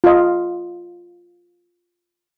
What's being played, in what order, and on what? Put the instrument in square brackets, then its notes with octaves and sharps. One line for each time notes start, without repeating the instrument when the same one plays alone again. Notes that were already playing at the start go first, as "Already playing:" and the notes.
[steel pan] F4 D#5